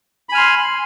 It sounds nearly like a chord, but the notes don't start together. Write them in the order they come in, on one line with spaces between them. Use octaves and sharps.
B5 G#5 F6 C6